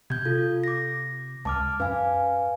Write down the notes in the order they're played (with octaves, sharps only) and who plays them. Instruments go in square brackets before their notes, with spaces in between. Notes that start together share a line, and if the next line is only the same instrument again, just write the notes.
[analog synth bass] C3 [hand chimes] G6 G#6
[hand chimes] F4 A4
D6 A#6
[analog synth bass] C#2 [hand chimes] A5 D6 F6
[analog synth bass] F#2 [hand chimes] B4 F5 G#5